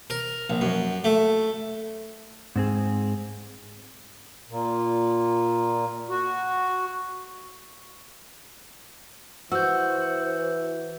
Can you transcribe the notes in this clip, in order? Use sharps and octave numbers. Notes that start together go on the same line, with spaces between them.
A#4
A#1
F#2
A3
G#2 C4 G#4
A#2
F#4
E3 F#4 C5 E6 G6